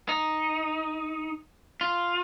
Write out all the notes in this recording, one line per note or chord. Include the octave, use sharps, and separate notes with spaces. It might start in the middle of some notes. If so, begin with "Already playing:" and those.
D#4
F4